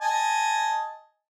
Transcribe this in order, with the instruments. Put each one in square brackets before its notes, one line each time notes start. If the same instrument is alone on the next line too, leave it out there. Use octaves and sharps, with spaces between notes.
[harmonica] D#5 G#5 A5